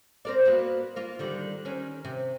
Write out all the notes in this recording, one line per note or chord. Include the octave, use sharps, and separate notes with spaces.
C4 A#4 D5
A#3 B3 F#4
A#3 F4
D3 D#3 G3
D#3 C#4
C3